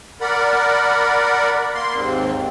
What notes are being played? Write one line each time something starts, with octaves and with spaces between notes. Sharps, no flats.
A#4 D5 F#5 B5
A#3 C6
D#2 G#2 C4